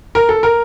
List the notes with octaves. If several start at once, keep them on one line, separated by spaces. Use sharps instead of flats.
A#4
A4
A#4